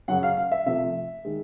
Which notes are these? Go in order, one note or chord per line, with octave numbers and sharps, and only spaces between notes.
F#2 C#3 F#3 F#5
F5
F5
E5
C3 F3 A3 E5
D#3 G#3